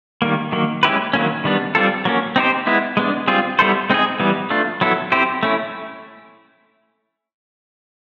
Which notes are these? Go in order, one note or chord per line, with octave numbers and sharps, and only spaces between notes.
D#3 G3 A#3
D#3 F#3 A#3
G#3 C#4 E4 G4 B4
D#3 F#3 A#3 C#4
D#3 G3 B3 D4
G3 C4 F4 A4
F#3 A#3 C#4
C4 D#4 G4 C5
G#3 B3 E4
G#3 B3 D4
G3 C4 F4 G#4
G3 B3 E4 A4 C5
G#3 C4 D#4 G#4
E3 G3 B3
A3 D4 F4
F#3 B3 E4 A4
C4 E4 G4 C5
A3 C#4 E4